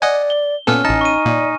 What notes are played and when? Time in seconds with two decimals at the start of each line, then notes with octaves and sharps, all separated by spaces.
0.02 D5 D#5 F#5 G#5
0.30 G7
0.67 A#2 B3 C#4 A4 G#5 F6
0.85 A1 D#4 A5
1.01 C#6 D#7
1.26 A#2 D5